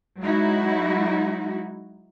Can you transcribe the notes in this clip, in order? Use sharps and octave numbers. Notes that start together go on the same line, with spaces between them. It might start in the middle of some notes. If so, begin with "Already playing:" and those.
F#3 G#3 D#4 E4 F#4